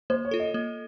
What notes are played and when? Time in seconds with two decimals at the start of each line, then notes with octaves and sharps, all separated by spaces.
0.10 A#3 C5
0.25 C#5
0.31 F4 A4
0.39 D#5
0.54 A#3